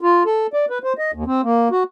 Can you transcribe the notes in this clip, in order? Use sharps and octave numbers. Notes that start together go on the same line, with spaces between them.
F4
A4
D5
B4
C5
D#5
D#2
C4
A#3
F#4